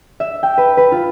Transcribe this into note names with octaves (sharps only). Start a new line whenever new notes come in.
E5
G5
B4
B4
F4